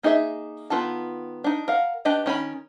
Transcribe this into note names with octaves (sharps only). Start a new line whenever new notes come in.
A#3 D#4 G#4 C#5 E5
D#3 B3 F4 A4 A5
D4 D#4
A#4 F5 F#5
D4 G4 B4 D5 D#5
D#3 C#4 F#4 B5